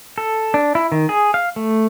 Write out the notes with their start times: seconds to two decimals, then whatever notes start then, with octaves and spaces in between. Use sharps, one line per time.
0.18 A4
0.54 D4
0.75 E4
0.92 D#3
1.09 G#4
1.34 F5
1.56 A3